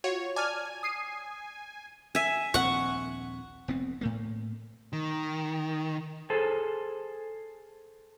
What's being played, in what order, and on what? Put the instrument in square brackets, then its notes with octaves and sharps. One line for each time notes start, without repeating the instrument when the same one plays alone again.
[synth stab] F4 F#4 [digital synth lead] C#5
[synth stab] D5 A5 F6 [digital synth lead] G#5
[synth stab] D#6 C7 D#7
[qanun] E5 G#5
[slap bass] D#1 A#1 C4 [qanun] F#5 C#6
[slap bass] F1 B3 C4
A2 A3 A#3
[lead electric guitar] D#3
[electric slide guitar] G#4 A4 C5